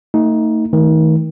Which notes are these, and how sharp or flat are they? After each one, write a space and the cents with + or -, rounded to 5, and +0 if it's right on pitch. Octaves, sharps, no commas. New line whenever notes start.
A3 +40 D#4 +20
D#3 +35 A3 +0